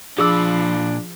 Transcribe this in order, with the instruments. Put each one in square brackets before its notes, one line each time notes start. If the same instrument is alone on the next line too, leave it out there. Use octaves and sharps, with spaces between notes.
[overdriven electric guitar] A#2 B5 [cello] F3 [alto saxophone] D4 [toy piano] G#4 D6 E6